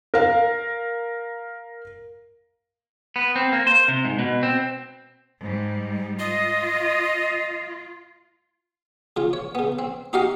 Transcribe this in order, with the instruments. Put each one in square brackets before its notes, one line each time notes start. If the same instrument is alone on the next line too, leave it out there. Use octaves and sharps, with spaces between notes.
[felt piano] A#4 F5
[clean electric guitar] B3
C4
A#3
C5
C3
G#2
B2
C4
[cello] G#2 G3
[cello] F4 [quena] D#5
[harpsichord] C#3 F4
C#5
C#3 B3
C4
D#4 F#4 G4 D#5 F5 F#5